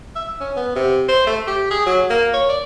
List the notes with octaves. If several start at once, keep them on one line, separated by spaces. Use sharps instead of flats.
E5
C#4
B3
C3
C5
A3
G4
G#4
F#3
A#3
C#5
D5